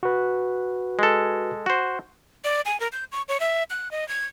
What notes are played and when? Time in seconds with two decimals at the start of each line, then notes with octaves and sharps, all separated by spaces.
0.03 F#4 B4
0.99 G#3 A4
1.66 F#4 C5
2.44 D5
2.65 G#5
2.80 A#4
2.92 G6
3.12 C#6
3.29 C#5
3.40 E5
3.70 F#6
3.91 D#5
4.08 G#6